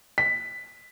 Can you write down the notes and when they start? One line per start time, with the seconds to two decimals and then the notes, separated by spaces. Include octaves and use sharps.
0.18 B6